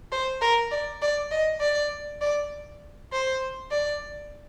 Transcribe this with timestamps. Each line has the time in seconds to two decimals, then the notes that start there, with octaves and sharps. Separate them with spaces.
0.12 C5
0.42 A#4
0.71 D5
1.02 D5
1.31 D#5
1.61 D5
2.21 D5
3.12 C5
3.71 D5